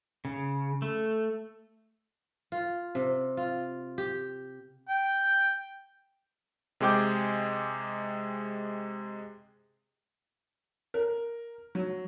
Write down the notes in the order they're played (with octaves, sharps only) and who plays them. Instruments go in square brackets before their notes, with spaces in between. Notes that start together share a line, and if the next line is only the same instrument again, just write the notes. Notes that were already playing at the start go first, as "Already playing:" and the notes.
[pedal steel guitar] C#3
A3
[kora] F4
C3
F4
G4
[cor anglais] G5
[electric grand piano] C3 G#3 G#4 G5 D6 G6
[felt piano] A#4
F#3